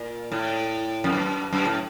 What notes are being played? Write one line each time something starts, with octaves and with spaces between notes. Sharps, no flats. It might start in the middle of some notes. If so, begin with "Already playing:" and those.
Already playing: A#2
A2
F2
F#2
F#2
A2